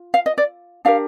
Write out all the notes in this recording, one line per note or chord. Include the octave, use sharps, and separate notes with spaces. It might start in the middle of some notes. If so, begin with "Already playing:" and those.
Already playing: F4
F5
D#5
D5
D4 G4 A#4 F5